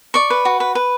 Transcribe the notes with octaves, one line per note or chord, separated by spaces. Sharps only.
D5 C#6
B4
F#4
B4
B4